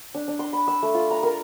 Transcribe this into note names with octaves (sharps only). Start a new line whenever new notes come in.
D4
D4
C6
B5
E6
A3
F4
A#5
A#4